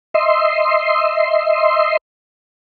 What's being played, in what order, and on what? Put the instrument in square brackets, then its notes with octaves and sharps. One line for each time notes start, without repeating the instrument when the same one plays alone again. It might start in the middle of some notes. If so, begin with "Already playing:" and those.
[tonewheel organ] D#5 E5 C6